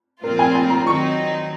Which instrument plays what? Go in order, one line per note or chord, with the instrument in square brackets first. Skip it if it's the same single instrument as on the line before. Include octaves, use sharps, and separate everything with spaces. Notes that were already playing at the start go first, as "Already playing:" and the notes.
[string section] A#2 F3 C4 F4 [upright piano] A#4
[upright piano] G#5
G#5
A#5
[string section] D#3 F#3 C4 D#4 [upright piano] C#6